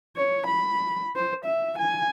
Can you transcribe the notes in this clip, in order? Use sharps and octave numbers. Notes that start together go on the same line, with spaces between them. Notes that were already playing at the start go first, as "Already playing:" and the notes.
C#5
B5
C5
E5
G#5